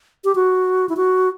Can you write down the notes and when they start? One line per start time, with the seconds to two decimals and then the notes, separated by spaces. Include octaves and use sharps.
0.24 G4
0.35 F#4
0.89 E4
0.97 F#4